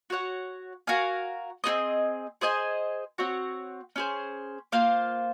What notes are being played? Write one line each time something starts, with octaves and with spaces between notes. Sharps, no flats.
F#4 C#5 F#5
F#4 A#4 F5 G#5
C4 D#4 G#4 D#5
G#4 C5 D#5 G#5
C4 F#4 C#5 F#5
C#4 G#4 C5
A#3 F4 C5 F5